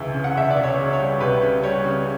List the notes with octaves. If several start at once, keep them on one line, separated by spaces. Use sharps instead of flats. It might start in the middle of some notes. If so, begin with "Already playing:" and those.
Already playing: C#2 C#3 E3 E5
C#3
F#5
C#2 E5
D5
C#2
C#5
C#3
C#5
G3
C#2 B4
C#3
G3 C#5
C#3